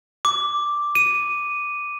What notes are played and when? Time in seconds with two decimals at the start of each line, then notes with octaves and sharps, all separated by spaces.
0.25 D6
0.95 D#7